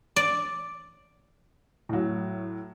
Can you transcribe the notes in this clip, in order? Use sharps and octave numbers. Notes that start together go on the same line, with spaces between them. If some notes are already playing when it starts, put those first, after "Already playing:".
D5
A2 F#3